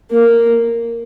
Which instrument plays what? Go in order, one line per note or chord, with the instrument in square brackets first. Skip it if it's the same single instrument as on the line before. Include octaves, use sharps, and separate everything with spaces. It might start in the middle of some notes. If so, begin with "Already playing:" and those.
[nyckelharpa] A#3